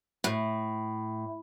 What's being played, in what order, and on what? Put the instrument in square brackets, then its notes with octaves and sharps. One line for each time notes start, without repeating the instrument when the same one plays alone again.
[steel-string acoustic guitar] A2